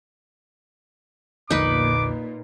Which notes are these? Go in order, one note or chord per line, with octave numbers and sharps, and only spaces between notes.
A#1 E2 A#2 D3 D#4 B4 D6